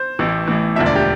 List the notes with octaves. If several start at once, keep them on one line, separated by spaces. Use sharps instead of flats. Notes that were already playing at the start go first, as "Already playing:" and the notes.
Already playing: C5
A1 A2 E3
A1 A2 E3
E1 D2 D3 F3 E5
D5
G4